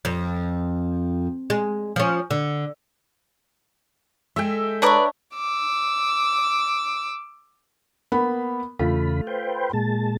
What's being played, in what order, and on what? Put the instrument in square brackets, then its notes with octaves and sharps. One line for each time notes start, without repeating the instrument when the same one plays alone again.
[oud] F2
G#3
F3 C#4
D3
[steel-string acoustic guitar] G#3 A4 [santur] E5 G5
[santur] D4 A#5 [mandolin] B4 D5 D#6 [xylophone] C#5 C#6
[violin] D6 E6
[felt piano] A#3 B3 B5
[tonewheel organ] E2 C#3 B5 [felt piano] A3 F4
[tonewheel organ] B4 C5 G5
A#2 G#3 A5